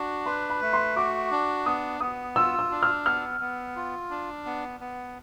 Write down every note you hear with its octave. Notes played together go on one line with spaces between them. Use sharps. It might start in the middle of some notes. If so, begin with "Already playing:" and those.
Already playing: D4 F#4
B4 C6
B5
A3
C6
F#4 D6
D4
B3 D#6
B3 D#6
F4 E6
E6
D4
F6
B3 F6
B3
F4
D4
B3
B3